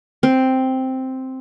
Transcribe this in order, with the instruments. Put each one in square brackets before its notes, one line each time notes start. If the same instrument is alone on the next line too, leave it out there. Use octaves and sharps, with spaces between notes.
[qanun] C4